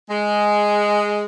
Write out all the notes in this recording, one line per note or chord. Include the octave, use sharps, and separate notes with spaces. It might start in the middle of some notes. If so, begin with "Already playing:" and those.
G#3